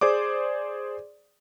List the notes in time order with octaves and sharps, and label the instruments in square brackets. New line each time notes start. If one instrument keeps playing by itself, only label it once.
[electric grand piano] G#4 C5 D5 D6